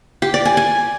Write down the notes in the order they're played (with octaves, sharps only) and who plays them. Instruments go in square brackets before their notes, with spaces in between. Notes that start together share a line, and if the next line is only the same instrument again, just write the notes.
[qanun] G4
D5
G#5
G#5